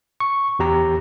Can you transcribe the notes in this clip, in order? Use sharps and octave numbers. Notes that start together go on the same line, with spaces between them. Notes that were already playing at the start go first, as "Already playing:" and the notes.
C#6
E2 G4 A#5